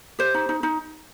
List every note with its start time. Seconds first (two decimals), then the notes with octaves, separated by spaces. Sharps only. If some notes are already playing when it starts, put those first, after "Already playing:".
0.19 G4 C5
0.34 D#4
0.49 D#4
0.63 D#4